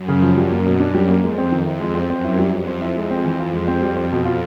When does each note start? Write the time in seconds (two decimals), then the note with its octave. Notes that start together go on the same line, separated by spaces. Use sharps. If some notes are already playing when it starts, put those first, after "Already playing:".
Already playing: F#2
0.08 C#3
0.22 F3
0.37 F#2 G3
0.51 A#3
0.66 B2
0.80 D4
0.95 G3
1.08 A#3
1.23 F2 G#3
1.38 C4
1.52 D#3
1.66 F2 E4
1.80 G#3
1.95 C4
2.09 F#2 C4
2.24 E4
2.39 G3
2.53 F2 G3
2.67 C4
2.81 E4
2.96 F2 G#3
3.11 C4
3.25 E3
3.39 F2 F4
3.53 G#3
3.68 C4
3.82 G3
3.96 C4
4.12 B2
4.25 F4